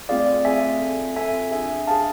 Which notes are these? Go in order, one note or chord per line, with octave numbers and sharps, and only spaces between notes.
A3 C4 F4 G#4 D5 F5
A3 C4 F4 G#4 E5 G#5
C4 F4 A4
C4 F4 A4 E5 G#5
D4 G#4 E5 G#5
D4 G#4 F5 A5